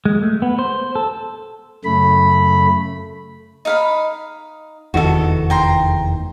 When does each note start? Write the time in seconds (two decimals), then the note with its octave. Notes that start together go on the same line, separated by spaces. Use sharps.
0.05 G#3
0.22 A3
0.42 B3
0.59 C5
0.95 A4
1.85 F#2 C#3 A3 B5
3.65 D#4 F5 B5
4.94 F1 E2 D#3 F#4 A4
5.50 G5 A#5 C6